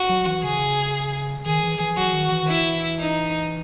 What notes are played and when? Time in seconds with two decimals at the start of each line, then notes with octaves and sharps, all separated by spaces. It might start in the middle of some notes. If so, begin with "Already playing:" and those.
Already playing: F#4
0.09 F#3
0.26 E3
0.43 C#3 G#4
1.46 D#3 G#4
1.63 E3
1.80 E3
1.97 F#3 F#4
2.13 D#3
2.32 E3
2.43 D#3
2.48 E3 E4
2.99 D#4